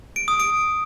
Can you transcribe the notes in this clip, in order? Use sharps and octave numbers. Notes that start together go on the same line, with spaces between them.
D7
D#6
D7